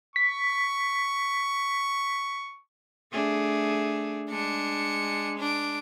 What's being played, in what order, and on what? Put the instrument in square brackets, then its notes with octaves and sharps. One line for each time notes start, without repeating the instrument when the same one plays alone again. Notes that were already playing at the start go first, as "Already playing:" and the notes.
[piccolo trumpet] C#6 [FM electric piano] B6
[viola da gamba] A3 D4 G#4
[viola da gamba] G#3 [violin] D4 C#7
[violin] D4 D7